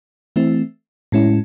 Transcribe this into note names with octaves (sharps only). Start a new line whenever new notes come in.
E3 A3 C4 E4
A2 G#3 C#4 E4